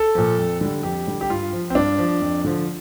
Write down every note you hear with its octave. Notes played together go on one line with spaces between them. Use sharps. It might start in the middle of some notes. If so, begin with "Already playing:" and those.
Already playing: A4
A#2 F3
F2
D3 G3
F2 G4
D3 G3
G4
G2 F4
F3
C4
G2 D4
F3
F2
D3 F3